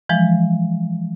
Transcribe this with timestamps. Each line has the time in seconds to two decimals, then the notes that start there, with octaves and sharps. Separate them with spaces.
0.09 E3 F3 G#3